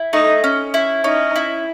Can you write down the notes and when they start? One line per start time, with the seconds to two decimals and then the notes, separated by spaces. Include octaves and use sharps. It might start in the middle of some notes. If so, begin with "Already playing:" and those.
Already playing: E4
0.13 A3 D#4
0.44 C#4
0.74 E4
1.04 C#4 D#4
1.36 E4